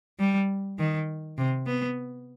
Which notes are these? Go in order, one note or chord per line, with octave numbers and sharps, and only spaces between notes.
G3
D#3
C3
B3